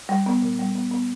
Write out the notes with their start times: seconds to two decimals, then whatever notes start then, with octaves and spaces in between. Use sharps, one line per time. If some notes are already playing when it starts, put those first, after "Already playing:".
0.09 G3
0.26 B3
0.42 A#2
0.59 G3
0.75 B3
0.91 B3